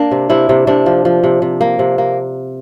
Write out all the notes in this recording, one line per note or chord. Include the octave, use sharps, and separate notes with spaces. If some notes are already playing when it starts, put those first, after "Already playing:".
Already playing: A#3 D4
C3
C3 E4
C3
C3 D4
F3
F3
C3
C3
A#3
C3
A#3